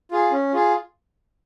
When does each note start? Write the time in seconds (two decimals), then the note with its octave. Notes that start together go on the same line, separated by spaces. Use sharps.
0.11 F4 G#4
0.32 C#4
0.53 F4 G#4